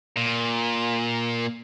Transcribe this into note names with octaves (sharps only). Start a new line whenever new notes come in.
A#2